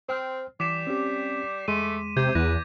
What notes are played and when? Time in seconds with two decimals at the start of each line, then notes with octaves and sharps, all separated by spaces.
0.09 C4 C5 G5 F6
0.60 E3 G3 D6 B6 E7
0.87 C4 C#4 G4
1.68 E2 G#3 A3 C6 D#7
2.17 C3 C5 D6 G6 G#6
2.35 E2 B4 A#6